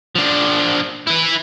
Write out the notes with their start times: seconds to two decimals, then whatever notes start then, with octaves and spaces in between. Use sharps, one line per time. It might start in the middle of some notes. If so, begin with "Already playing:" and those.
0.15 F3 D4
1.07 E4 B4